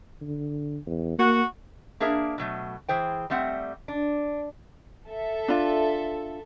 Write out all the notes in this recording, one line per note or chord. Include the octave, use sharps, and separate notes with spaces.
D3
E2
A#3 F#4
A#3 D4 G#4 A#4 E5
B2 F#3 A3
E3 G#4 C5 G5
G3 A3 C4 E5 F#5
D4
A4 E5
D4 F4